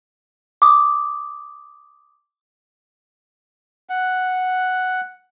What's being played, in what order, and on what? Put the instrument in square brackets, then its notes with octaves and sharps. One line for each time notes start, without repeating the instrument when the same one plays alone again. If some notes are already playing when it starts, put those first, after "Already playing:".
[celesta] D6 D#6
[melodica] F#5